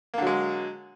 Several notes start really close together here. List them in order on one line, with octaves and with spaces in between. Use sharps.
A#3 D3 F#3 G#3